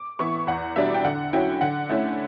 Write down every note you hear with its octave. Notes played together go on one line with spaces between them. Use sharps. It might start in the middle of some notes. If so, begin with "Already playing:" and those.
Already playing: D6
E3 B3 E4 C#6
E2 F#5
B2 G3 D4 E5
G5
D3 F#5
F#3 C#4 E4 G5
D3 F#5
A3 C#4 E4